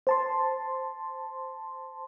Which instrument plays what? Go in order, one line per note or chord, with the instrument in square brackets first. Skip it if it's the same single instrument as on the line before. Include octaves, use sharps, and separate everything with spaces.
[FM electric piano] C5 A5 C6